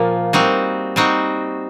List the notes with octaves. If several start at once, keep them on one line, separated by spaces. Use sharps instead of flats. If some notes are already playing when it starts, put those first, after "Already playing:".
Already playing: A#2 F3 A#3
G3 C4 D#4 F#4
G3 C4 D#4 F#4